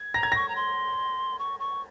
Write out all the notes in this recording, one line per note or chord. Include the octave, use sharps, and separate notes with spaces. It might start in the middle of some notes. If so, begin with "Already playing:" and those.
Already playing: G#6
A#5 A#6
G#6
C#6 A#6
A#5
C6
C#6
C#6